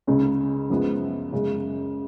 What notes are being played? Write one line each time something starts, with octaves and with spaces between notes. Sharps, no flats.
C#2 C#3 G#3 C#4
F#2 F3 G#3 B3
F#2 C#3 G#3